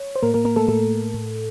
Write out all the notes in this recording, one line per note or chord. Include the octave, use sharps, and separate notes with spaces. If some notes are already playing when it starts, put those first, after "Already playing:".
Already playing: C#5
C5
A2 A#3 A#4
A#3 A#4
A#3 A#4
A3 A4
A2 A3 A4
A2